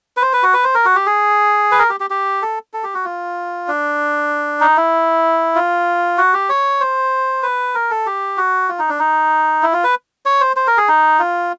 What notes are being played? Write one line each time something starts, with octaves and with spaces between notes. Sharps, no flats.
B4
C5
B4
F#4
B4
C5
A#4
F#4
G4
G#4
B4
A#4
G4
G4
G4
A4
A4
G4
F#4
F4
D4
D#4
E4
F4
F#4
G4
C#5
C5
B4
A#4
A4
G4
F#4
F4
D#4
D4
D#4
E4
F4
B4
C#5
C5
C5
A#4
G#4
D#4
F4